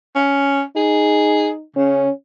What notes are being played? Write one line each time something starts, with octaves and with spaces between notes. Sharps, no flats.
C#4
D#4 G#4
C#3 C#4